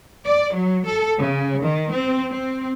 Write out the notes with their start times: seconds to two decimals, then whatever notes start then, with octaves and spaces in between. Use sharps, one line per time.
0.25 D5
0.54 F#3
0.86 A4
1.18 C#3
1.61 D#3
1.91 C4
2.32 C4